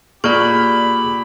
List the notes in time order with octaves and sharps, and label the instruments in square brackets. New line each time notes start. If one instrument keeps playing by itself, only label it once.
[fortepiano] A#2 F6 [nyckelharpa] G4 B5 [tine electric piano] G#4 [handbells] D5 C#6